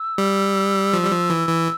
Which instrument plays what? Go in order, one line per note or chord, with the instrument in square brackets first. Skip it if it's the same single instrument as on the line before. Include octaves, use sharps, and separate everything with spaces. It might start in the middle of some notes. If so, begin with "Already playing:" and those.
Already playing: [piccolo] E6
[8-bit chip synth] G3
F3
G3
F3
E3
E3